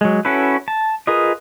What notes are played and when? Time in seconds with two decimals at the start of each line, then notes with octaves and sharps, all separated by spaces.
0.01 F#3 G#3
0.25 C#4 E4 F#4 A4 B4
0.68 A5
1.07 F4 G#4 A#4 B4 D#5